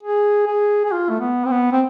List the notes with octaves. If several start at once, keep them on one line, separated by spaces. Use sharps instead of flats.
G#4
G#4
G#4
F4
A3
B3
C4
B3
C4